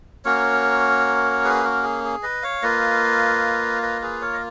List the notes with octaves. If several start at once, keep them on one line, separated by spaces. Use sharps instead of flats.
A#3 C#4 F#4 A#4 C#5
G#4 B4
F#4 A#4
G#4
G#4
B4 D#5
C#5 F5
A#3 F4 B4 D#5
B4 D#5
G#4 B4
A#4 C#5
D#5